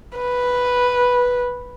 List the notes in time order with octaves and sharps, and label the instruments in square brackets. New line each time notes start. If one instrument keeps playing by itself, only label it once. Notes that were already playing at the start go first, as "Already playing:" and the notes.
[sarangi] B4